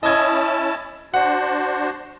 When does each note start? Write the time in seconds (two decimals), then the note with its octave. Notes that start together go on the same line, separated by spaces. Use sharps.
0.03 C#4 E4 D#5 A5 G#6
1.14 D4 F#4 C5 F#5